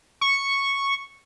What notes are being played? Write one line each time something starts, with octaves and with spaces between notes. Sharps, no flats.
C#6